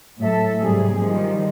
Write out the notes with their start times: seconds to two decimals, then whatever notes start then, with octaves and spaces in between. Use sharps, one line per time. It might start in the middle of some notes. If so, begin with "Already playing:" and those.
0.19 A2 F#3 A4 E5
0.60 G#2 C3 G3 A#3 G#4
1.01 D#3 F3 G3 G#3